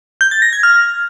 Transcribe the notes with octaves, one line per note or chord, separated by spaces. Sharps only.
G6
A6
A#6
G#6
F6